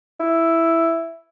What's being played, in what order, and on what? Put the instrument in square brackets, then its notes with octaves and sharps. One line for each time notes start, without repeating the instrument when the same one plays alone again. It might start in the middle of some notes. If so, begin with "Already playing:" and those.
[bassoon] E4